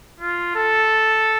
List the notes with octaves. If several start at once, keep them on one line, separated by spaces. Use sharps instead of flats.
F4
A4